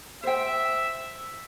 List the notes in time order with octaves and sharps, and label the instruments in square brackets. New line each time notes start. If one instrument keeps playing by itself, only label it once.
[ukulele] C5 G5 [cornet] E5